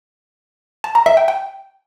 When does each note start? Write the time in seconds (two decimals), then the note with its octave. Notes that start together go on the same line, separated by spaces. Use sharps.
0.84 A5
0.95 A#5
1.06 E5
1.17 G5
1.28 G5